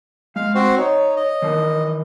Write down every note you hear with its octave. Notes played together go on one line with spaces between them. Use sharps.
G#3 F5
C4 F#4 C5
D#4 C#5
D#5
D#3 E3 A5